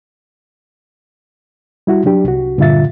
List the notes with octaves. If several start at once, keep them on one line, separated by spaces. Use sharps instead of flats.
G3 E4 F#4
F#3 D4 G4
C2 F#4
G2 A#2 D3 F4 E5 A6